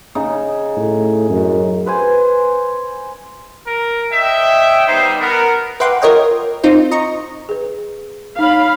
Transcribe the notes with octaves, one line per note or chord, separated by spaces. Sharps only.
C#3 D#4
A2
F#2
B4 C5 G#5
A#4
C#5 D#5 E5 G5
G3 B3 D#4 C5
B3 A#4
B4 E5 F#5 G5 C6 D6
F4 A#4 C#5 D#5 G5
C4 D#4 F4 C5
D#5 A#5 C#6
G#4 B4
D#4 C#5 F5 B5